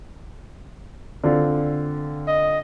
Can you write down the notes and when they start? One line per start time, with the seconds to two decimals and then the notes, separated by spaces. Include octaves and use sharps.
1.24 D3 C4 F4
2.28 D#5